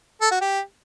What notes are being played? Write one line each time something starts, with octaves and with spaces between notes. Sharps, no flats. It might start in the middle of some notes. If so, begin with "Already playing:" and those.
A4
F#4
G4